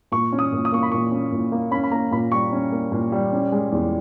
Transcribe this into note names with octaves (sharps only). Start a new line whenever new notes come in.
A#2 C#6
C#4
D#6
A#2
D#6
A#3 C#6
B5
A#2 C#6
C#4
A#2
A#3
C#4 B5
B5
A#3 A#5
A#2 B5
G3 C#6
C#4
A#3
A#2
G3
C#4
G#3
E2